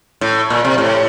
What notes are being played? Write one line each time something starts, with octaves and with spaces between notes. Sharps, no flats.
A2
A#2
C3
A2